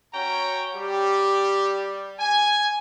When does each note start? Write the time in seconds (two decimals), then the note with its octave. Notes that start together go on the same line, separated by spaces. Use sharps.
0.14 C#4 F#4 C#5 G5 A#5
0.75 G3 G4
2.20 G#5